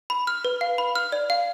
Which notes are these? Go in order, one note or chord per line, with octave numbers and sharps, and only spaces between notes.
B5
F6
B4
F5
B5
F6
D5
F5